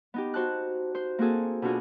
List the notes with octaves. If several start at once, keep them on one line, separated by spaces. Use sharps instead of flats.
B3 D#4 G4
F#4 C5 A5 F#6
C5
A#3 C4 F#4 G#4 A4
B2 D4 F4 F#4 G#4